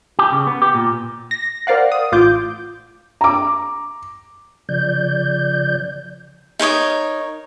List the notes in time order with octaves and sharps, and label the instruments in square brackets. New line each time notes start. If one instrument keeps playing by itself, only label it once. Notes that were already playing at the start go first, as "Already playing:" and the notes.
[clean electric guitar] G4
C#3
B3
G4
A#2
[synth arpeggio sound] A#6
A#4 C5 D5 F5 F#5
D#6
A1 F4 D6 G6
[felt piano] A#5 D6
[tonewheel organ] C#3 F3 D5 G6
[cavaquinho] D#4 A#4 C#5 D#6